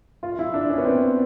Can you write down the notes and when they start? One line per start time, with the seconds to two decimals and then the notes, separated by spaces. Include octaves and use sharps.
0.23 F4
0.39 E4
0.54 D4
0.70 C#4
0.78 B3
0.85 C4